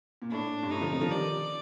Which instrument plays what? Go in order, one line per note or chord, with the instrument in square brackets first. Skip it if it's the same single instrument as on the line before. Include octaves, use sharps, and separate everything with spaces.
[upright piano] A#2
[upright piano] A2 [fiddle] D4
[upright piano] G2
[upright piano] A2 [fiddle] D#4
[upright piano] D3 F3
C3 D#3
D3 F3
[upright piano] D#3 G3 [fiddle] D5